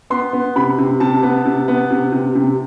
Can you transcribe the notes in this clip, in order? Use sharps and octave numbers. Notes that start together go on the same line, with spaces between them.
B3 C6
B3
C3 B5
C3
C3 A5
B3
C3
B3
C3
C3
C3